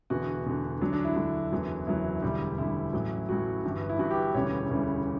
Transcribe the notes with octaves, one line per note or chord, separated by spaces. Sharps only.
E1 E2 D3 F#4
E1 E2 D3
D2 D3 F#3 D4
D4
E4
D2 D3 F#3
F#1 E2 D3 F#3
F#1 E2 D3 F#3 E4
E1 D2 D3 G3
E1 D2 D3 G3 E4
A1 A2 F#3
A1 A2 F#3 F#4
G1 G2 E3
E4
G1 G2 E3 F#4
G4
E1 D2 C#3 E3 G3 C#5
E1 D2 C#3 E3 G3